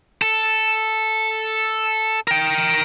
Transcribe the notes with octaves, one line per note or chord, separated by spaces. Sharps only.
A4
A#4 G5